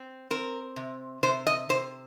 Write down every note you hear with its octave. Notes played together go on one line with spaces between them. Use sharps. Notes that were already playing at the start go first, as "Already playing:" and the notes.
Already playing: C4
C4 A#4
C3
C3 C5
D#5
C3 C5